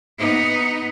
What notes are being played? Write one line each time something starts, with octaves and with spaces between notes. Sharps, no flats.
B3 D#4